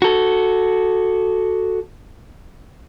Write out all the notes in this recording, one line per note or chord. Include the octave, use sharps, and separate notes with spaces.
F#4 A4